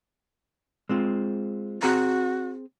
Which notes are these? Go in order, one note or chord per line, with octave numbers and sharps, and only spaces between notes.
G#3 C4 F4
C4 F#4 G#4 A#5